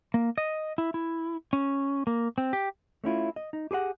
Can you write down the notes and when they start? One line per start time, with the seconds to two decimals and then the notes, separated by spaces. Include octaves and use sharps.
0.14 A#3
0.38 D#5
0.78 E4
0.94 E4
1.53 C#4
2.07 A#3
2.38 C4
2.53 G4
3.04 A3 C#4 E4 F4
3.36 D#5
3.53 D#4
3.71 G4 G#4 C5 F#5